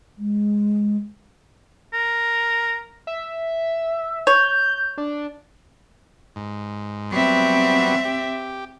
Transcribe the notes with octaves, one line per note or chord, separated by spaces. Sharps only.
G#3
A#4
E5
C#5 G6
D4
G#2
F#3 G3 B3 C4 E5
G4